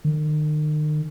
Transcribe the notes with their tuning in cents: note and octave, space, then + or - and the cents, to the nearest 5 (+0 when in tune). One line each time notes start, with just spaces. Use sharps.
D#3 -40